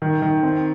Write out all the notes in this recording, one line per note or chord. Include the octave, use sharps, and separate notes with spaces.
D#3
D#3
C4